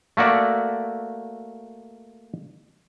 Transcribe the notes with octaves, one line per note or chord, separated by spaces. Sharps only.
A3 A#3 F#4 D5 E5